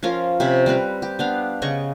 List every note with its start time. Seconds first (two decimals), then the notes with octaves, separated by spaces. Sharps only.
0.03 F3 C#4 F4 A#4
0.40 C3 C#4 B5
0.66 G3 C4 B4 A#5
1.02 G4
1.19 B3 D4 F5
1.62 C#3 D#5 C#6